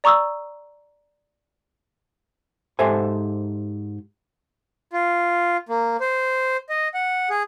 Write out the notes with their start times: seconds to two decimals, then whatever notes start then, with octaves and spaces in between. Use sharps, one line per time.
0.04 D5 A#5 C#6 D#6 E6
2.79 G#2 G4 A4 C5 E5 G#5
4.93 F4
5.69 A#3
6.00 C5
6.69 D#5
6.94 F#5
7.30 G#4